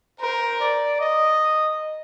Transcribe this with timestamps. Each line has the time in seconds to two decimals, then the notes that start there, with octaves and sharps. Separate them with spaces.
0.20 A#4 C5
0.60 D5
1.00 D#5